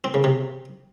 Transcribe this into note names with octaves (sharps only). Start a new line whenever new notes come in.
C4
C#3
C3